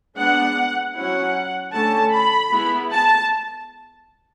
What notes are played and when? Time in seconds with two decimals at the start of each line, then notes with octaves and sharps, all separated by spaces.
0.15 G#3 B3 D4 F#5
0.94 F#3 C#4 E4 F#5
1.73 D3 A3 C#4 A5
2.13 B5
2.51 G#3 B3 E4
2.92 A5